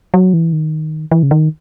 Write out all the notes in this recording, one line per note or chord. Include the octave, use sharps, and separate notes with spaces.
F#3
E3
D#3
E3
C#3
D#3